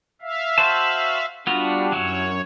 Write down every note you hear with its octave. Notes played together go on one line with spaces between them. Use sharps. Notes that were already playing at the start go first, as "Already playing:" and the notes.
E5 F5
F#4 C5 A5
G3 B3 D4 F4 F#4
F#2 F#3 C#4 E4 C#5